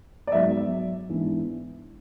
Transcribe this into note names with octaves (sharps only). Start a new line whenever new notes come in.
D5
G#2 F#3 B3 E5
G#2 E3 B3 D4